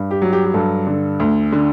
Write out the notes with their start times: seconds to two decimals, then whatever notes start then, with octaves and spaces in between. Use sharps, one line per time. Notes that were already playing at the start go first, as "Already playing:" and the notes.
Already playing: G2
0.11 G4
0.22 F#3
0.33 G4
0.45 G4
0.54 G2 A4
0.87 D3
1.20 D2
1.52 D3